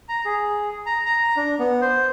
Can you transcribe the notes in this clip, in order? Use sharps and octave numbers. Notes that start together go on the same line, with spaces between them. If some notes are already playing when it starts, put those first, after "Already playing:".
A#5
G#4
A#5
A#5
D4
B3
C5